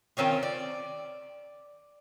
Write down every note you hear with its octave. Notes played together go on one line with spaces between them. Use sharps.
D#3 C4 C#4 F4
D5